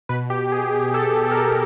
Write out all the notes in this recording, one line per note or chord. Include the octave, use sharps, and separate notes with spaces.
B2 B4
G4
G#4
G#4
A4
A4
A#4
A4